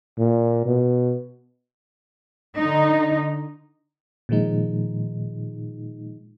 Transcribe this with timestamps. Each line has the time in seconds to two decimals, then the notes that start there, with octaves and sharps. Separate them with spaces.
0.18 A#2
0.65 B2
2.58 D3 D#4
4.29 A#2 D#3 F3 G#3 D#4